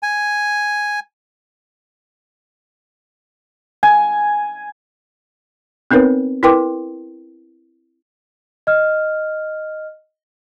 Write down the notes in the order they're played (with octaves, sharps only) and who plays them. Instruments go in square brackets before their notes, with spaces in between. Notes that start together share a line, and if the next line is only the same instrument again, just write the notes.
[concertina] G#5
[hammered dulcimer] G#5
[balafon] B3 C4 D#4 A#4 B4 C#5
E4 A#4 B4 G5 C6 D6
[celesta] D#5 F6